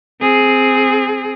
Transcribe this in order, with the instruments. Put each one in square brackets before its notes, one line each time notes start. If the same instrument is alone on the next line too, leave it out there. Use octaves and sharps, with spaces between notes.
[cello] C4 G#4